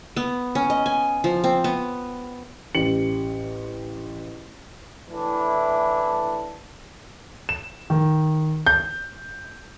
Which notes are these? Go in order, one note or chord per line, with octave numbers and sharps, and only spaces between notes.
B3
C#4
D#5
G#5
F3
C4
B3
A1 G4 C#7 F#7
A2 E3 D4 E4
E7
D#3
G6